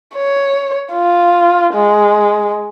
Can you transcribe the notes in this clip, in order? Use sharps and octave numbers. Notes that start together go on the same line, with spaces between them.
C#5
F4
G#3